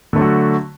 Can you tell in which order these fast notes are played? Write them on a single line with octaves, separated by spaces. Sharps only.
D3 A3 F#3 F#4